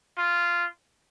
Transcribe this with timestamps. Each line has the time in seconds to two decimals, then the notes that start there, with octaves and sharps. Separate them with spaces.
0.18 F4